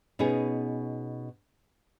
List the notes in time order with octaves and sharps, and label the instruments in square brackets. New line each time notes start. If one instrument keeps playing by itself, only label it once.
[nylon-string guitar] B2 B3 C#4 D#4 G#4